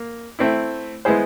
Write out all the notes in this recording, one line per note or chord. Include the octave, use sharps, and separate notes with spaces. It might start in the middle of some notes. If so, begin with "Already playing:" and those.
Already playing: A#3
A3 C4 E4
G#3 B3 E4 G#4 C5